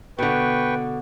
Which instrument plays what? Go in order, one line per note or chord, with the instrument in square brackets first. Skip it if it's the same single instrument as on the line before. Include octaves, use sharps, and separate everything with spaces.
[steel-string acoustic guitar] B2 D3 [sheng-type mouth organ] B4 G5 C#6